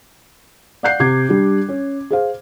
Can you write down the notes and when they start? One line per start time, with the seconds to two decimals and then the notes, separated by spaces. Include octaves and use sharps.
0.83 D5 F5 F#5 F#6 G6 C7
1.00 C3 D6 G#6
1.29 G3 D4
1.69 C#4
2.10 G#4 C5 F5